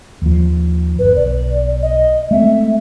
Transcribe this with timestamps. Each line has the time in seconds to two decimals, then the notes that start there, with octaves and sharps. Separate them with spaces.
0.22 D#2 F3
0.99 G1 B4
1.16 B1 D5
1.82 D#5
2.31 G#3 A3 C4 E5